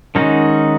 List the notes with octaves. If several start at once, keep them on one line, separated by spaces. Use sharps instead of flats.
D#3 G#3 C#4 D#4 F#4